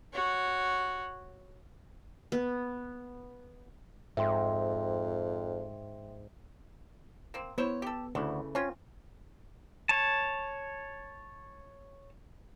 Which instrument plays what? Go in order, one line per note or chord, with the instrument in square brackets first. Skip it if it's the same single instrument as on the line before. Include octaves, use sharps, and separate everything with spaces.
[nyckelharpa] F#4 C#5
[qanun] B3
[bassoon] F2 [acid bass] G#2 [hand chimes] E5 G5 C6
[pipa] A#3 C4
[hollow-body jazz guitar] B3 [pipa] E4 C5 C#5
[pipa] G4 A4
[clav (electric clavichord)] D2 [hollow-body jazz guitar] C#3 A3 [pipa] E3
[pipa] C4 F4 [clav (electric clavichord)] C#4
[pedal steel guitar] C#5 A5